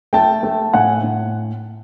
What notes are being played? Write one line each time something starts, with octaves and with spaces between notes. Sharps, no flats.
A3 G5 A5
A3
A2 F#5 G#5
A2